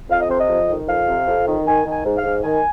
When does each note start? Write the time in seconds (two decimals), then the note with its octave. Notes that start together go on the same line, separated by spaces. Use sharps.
0.10 F2 F5
0.20 D#5
0.29 C3 C5
0.39 D#5
0.48 F2
0.68 D#3
0.88 F2 F5
1.07 C3
1.27 F2
1.47 D#3
1.66 D#3 G#5
1.86 D#3
1.91 G#5
2.05 G#2
2.17 F5
2.23 G#2
2.44 D#3 G#5